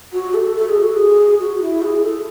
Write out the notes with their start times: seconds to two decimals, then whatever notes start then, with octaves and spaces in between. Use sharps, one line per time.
0.13 F#4
0.34 A4
0.56 A4
0.69 G#4
0.82 F#4
0.96 G#4
1.39 F#4
1.61 E4
1.82 G#4
2.03 A4